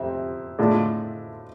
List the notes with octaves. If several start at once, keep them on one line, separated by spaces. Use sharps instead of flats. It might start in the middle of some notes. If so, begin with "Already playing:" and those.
Already playing: F2 C3 C5 E5
A2 G#3 D4 F4